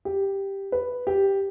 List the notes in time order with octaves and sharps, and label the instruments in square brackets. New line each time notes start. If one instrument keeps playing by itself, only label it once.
[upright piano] G4
B4
G4